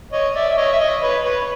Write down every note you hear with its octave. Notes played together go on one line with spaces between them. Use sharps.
C#5 D#5
D5 E5
E5
C#5 D#5
E5
C#5 D#5
B4 C#5
B4 C#5